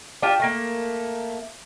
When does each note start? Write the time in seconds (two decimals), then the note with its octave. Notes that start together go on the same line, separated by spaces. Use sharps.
0.23 D4 F4 G4
0.40 A3 A#3